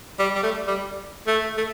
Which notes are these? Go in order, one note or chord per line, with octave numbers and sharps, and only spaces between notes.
G3
G3
A3
G3
A3
A3